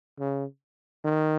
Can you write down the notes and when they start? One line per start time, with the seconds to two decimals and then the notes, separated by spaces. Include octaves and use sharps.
0.19 C#3
1.04 D#3